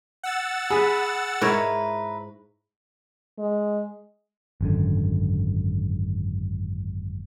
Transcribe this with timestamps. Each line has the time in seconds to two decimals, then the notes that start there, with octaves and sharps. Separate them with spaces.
0.23 F#5 E6 A6
0.70 G#4 B5
1.41 G#2 E4 A#4 B4 C#5 E5
3.39 G#3
4.61 G#1 F#2 D3